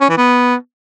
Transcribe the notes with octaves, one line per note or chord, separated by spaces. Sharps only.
C#4
E3
B3